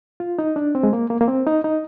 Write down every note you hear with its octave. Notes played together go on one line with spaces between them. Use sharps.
F4
D#4
D4
C4
G#3
A#3
A#3
A#3
C4
D#4
D#4